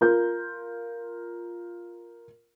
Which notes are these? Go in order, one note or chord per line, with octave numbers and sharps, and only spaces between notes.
F4 A#4 G6